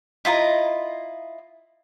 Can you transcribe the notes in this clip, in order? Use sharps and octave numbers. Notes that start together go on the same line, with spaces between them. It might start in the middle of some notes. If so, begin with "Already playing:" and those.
E4 F4 D#5 A#5